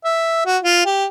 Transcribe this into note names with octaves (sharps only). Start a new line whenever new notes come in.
E5
F#4
F4
G4